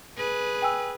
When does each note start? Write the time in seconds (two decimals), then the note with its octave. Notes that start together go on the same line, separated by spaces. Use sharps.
0.17 G#4 B4
0.62 G5 G#5 E6